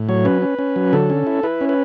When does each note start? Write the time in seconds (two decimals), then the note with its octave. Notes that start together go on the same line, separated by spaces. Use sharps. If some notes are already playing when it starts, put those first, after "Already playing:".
Already playing: A2
0.09 F#3 C#5
0.25 C#4 B4
0.42 C#4
0.59 C#4
0.76 F#3
0.93 D3 A4
1.10 C#4
1.27 E4
1.43 E4 B4
1.61 C#4
1.69 B4